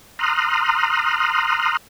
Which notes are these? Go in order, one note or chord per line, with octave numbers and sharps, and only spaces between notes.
A#5 C6 D#6 F6 F#6